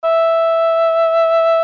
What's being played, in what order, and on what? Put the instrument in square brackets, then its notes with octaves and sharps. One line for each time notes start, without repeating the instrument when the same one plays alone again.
[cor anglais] E5